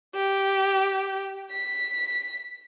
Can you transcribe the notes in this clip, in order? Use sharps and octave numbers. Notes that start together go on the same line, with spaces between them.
G4
B6